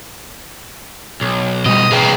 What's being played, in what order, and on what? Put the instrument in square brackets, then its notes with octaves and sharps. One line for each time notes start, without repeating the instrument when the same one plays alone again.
[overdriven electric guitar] B1
[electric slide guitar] B2 G3 [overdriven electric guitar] D#5
[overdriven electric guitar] C2 A#3 [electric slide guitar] G#4 B4 G5